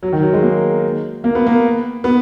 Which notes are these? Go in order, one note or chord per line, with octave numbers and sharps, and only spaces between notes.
F#3
D#3
F#3
G#3
A#3
A#3
B3
A#3
B3